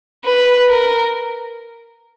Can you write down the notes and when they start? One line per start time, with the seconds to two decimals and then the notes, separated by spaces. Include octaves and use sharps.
0.25 B4
0.69 A#4